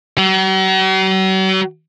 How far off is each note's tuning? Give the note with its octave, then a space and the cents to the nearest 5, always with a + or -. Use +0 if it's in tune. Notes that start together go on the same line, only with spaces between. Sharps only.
F#3 +45